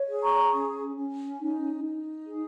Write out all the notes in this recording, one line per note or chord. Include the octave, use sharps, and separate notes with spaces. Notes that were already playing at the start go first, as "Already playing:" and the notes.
Already playing: C#5
G#4
A#5 C#6
C#4
C#4
D#4
D#4
G#4